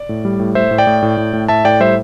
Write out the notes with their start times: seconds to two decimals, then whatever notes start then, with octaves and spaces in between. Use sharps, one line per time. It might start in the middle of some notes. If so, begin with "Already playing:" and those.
Already playing: D5
0.09 A2
0.25 G3
0.40 A2
0.55 A2 C5 E5
0.71 A2
0.78 D5 G5
0.87 A2
1.03 A2
1.17 A2
1.33 A2
1.48 A2 E5 A5
1.65 A2 D5 G5
1.80 G3 C5 E5